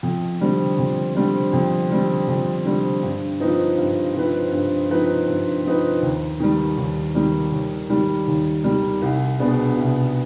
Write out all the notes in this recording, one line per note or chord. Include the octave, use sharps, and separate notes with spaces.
F2
D3 G3 C4
F2
D3 G3 C4
F2
D3 G3 C4
F2
D3 G3 C4
G2
F3 C4 D#4 B4
G2
F3 C4 D#4 B4
G2
F3 C4 D#4 B4
G2
F3 C4 D#4 B4
D#2
D#3 G3
D#2
D#3 G3
D#2
D#3 G3
D#2
D#3 G3
C2
B2 B3 D4 G#4
C2